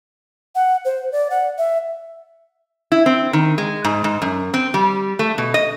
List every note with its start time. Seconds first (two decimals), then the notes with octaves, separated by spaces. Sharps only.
0.55 F#5
0.85 C5
1.12 D5
1.30 F#5
1.58 E5
2.92 E4
3.06 C4
3.33 D#3
3.58 G#3
3.84 G#2
4.04 G#2
4.22 F#2
4.54 C4
4.74 G3
5.19 A3
5.38 B2
5.54 D#5